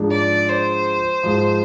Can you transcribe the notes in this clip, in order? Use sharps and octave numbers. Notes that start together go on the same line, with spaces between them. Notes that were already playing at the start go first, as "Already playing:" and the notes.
Already playing: G#2 F3 G#3 D4
D5
C5
G#2 F3 G#3